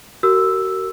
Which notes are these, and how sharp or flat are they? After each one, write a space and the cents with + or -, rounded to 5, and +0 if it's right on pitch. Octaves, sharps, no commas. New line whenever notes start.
F#4 +35 A#4 -20 E6 +0